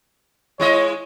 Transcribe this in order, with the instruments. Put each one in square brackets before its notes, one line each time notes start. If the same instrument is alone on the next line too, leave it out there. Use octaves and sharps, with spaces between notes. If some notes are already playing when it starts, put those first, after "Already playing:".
[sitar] G#3 E4 D#5 [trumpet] C#5